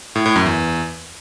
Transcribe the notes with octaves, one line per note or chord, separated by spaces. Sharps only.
A2
A2
F#2
E2